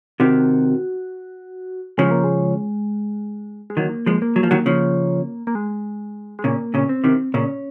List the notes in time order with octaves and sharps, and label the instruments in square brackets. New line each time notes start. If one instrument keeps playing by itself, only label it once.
[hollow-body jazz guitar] C3 D#3 [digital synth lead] F#4
[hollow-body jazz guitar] C#3 F3 [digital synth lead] G#3
[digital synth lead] A#3
G#3
G#3
[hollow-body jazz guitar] D#3 F#3 [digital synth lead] A#3
[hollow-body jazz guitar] F3 G#3
[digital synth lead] A#3
[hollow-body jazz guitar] F#3
F3
D#3 F#3
C#3 F3
[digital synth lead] A#3
G#3
G#3
[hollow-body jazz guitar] A#2 C#3 [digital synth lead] A#3
[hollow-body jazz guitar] A#2 C#3 [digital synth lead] C#4
[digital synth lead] C4
[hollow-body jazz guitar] C3 D#3
[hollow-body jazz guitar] A#2 C#3 [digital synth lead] C#4